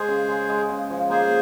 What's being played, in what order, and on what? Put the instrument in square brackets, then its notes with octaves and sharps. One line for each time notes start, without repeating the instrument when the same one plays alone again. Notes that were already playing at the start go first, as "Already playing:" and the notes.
Already playing: [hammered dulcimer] G#3 [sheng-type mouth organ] G#4 C5
[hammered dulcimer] C#3
G#3
G#3
C#3
F3
[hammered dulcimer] A#3 [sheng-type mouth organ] G#4 C5